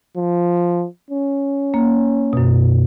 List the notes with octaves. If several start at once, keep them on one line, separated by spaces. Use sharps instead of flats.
F3
C#4
A#3
F#2 B2